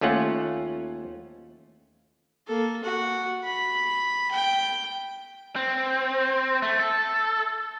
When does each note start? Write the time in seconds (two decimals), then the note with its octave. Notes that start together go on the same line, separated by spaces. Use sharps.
0.01 D#2 A3 C#4 F4 F#5
2.47 A#3 A4
2.84 F#4 F#5
3.45 B5
4.31 G5
5.56 C4
6.62 A3
6.79 A4